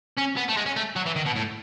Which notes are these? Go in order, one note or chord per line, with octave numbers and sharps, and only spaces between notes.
C#4
B3
A3
G#3
C#4
A3
F#3
E3
D#3
B2
A2